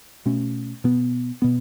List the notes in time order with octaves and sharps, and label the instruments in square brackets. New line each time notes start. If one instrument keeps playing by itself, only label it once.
[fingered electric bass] B2 A3 C#4
B2 B3
B2 B3